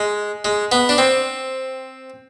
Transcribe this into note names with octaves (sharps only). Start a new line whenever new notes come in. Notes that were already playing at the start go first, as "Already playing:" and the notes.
Already playing: G#3
G#3
B3
D4
C4